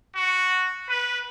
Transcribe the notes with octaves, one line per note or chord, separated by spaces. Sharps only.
F#4
B4